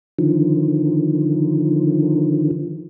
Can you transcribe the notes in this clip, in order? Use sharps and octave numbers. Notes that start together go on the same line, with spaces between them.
D3 D#3 F3